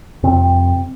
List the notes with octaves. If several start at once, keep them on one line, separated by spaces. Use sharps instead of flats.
F2 C3 C4